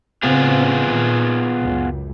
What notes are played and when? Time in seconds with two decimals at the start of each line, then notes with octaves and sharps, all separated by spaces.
0.23 A2 C#3 B3 C4 F4 G#4
0.88 A#2 D#3
1.60 C#2 F#2